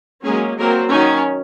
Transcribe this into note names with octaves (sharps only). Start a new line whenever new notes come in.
F#3 G#3 A#3 C#4 G#4
F#3 A#3 C4 A#4
D#3 F#3 C#4 D#4